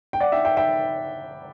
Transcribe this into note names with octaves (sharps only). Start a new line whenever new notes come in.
G5
D5 F#5
E5 G5
E5 G5
E5 G5